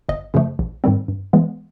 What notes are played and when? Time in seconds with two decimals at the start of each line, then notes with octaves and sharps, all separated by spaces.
0.09 G1 D#5
0.34 F#2 C#3 F3 A3
0.59 A#1
0.84 G#2 D#3 G3 C4
1.08 G2
1.33 E3 G#3 B3